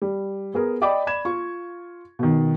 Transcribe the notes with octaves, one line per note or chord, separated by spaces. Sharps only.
G3
B3 G#4 A#4
D5 D#5 G5 B5 D6
D5 B5 G#6 E7
F4 C#6
B2 D#3